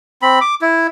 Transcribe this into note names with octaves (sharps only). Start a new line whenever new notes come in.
C4 B5
D6
E4